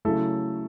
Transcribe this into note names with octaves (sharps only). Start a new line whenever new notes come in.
C#3 F#3 A3 E4 A4